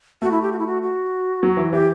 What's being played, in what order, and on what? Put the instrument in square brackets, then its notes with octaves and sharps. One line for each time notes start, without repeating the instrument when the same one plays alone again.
[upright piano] A3 [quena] F#4
[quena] E4
G4
F#4
E4
F#4
F#4
[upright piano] F#3
E3
[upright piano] E3 [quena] G4